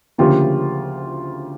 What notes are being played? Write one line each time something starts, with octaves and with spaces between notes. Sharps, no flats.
D2 C#3 F3 A#3 F4 G4